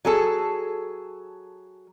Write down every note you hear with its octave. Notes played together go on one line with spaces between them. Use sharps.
F#3 G#4 A4